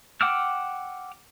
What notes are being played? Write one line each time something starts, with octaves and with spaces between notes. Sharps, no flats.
F#5 G5 D6 E6 F6